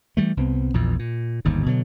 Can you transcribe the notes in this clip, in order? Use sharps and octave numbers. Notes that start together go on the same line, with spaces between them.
E3 F#3 G3 A3
C2 B3 C4
A#1 E2 A#2
A#2
G1 D#2 G#2
B2 D3 F#3